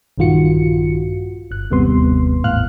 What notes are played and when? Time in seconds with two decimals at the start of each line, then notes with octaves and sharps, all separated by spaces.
0.18 A#1 G2 D#3 F4 F#4 C#7
1.51 G1 F#6
1.71 G1 D#2 C3 G3 B3 C6
2.44 G#1 E2 A2 F5 F6 F#6